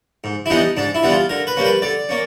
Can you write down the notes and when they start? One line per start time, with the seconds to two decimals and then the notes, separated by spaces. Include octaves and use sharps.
0.24 G#2
0.46 E4
0.50 E3 G3 B3 D4 D#4
0.77 G#2 D4
0.95 E4
1.03 E3 G3 B3 D4
1.12 F4
1.29 D3 A#4
1.47 B4
1.57 G3 A#3 C#4
1.65 B4
1.82 D3 D5
2.09 A#3 C#4